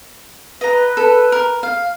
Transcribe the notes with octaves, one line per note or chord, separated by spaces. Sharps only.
B4 D#5 A#5
A4
A#4
F5